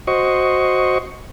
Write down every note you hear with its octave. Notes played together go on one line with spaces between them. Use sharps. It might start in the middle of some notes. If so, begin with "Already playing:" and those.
F#4 C5 D#5 C#6